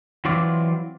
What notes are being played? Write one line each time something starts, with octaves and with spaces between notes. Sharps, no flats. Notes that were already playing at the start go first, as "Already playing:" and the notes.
E3 F#3 C4 F4 D5